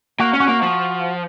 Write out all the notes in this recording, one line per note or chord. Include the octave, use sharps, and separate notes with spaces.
A#3 F#4
C#4
F#4
A#3
F3